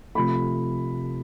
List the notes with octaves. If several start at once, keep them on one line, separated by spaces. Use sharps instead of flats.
C3 F3 A3 B5